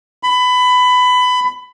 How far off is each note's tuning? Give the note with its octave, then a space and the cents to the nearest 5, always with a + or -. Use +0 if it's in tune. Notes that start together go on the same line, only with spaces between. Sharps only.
B5 +20